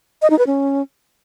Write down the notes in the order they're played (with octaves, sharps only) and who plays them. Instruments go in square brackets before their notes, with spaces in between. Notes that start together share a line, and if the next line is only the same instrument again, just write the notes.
[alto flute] D#5
D#4
B4
C#4